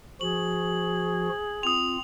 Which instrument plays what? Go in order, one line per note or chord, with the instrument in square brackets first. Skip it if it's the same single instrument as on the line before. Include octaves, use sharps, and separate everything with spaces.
[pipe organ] F3 F#4 [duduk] G#4 [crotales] F#7
[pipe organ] C4 F4 [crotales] D#6 F7